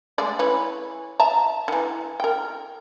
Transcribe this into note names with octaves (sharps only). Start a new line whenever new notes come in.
G#3 A3 D5
E3 C#4 B4
E5 A5 A#5
D#3 E3
A#4 G5